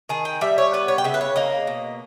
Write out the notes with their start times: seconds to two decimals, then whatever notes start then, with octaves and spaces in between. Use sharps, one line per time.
0.09 D#3 G#4
0.25 G5
0.41 G3 E5
0.58 C#5
0.73 B3 B4
0.88 C#5
0.98 G5
1.04 C#3 E5
1.14 B4
1.21 C#5
1.36 A#3 D#5
1.67 B2